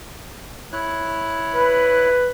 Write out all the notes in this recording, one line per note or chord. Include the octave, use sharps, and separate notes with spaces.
E4 C#5 F#6
B4